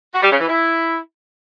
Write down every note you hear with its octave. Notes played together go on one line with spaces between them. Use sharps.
F#4
G3
C#3
E3
E4